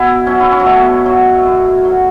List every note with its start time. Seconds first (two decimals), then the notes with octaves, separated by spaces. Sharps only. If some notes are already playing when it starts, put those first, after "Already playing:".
Already playing: B2 E4
0.27 F#3 C#4
0.40 E4
0.52 C#4
0.60 F#3
0.66 B2 A3
1.06 F#3
1.46 F#2
1.85 F#3